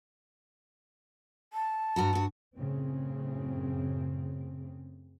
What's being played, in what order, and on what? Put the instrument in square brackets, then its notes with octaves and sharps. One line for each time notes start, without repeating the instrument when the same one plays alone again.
[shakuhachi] A5
[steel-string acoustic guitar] G2 F#4 A#5
G2 F#4
[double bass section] F#2 A2 C#3 C4